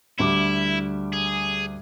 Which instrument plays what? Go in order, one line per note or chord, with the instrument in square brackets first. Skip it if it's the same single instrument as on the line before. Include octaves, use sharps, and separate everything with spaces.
[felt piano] D2 G3 D6 [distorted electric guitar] E4
[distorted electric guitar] G#4